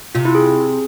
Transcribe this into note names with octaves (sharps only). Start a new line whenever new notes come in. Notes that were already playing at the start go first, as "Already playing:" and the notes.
C3 F4
E4
G#4